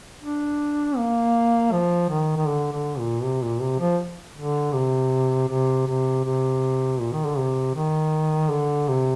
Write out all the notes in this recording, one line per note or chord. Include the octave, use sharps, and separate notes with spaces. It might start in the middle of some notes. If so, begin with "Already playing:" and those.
D4
A#3
F3
D#3
D#3
D3
D3
A#2
C3
A#2
C3
F3
D3
C3
C3
C3
C3
A#2
D#3
D3
C3
D#3
D3
C3